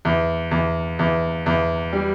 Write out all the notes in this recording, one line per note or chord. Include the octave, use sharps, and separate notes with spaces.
E2
E2
E2
E2
G3